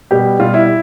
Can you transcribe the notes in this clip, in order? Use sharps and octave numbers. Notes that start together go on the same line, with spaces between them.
B2 G3 G4
B2 G3 F4
E4